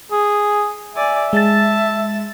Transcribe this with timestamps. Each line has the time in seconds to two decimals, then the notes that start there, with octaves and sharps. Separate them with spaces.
0.11 G#4
0.96 D5 E5 G#5
1.33 G#3 A5 A6